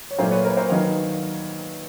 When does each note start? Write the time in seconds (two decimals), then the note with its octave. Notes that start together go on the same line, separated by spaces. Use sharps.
0.11 C#5
0.18 A#2 F#3 A3 D4 F4 A#4 C5
0.31 B4 C#5
0.45 A#4 C5
0.57 A#4 C5
0.70 D#3 F#3 B3 D#5 F5